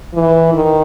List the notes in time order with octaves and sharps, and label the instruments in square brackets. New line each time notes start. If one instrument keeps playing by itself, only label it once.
[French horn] E3
D#3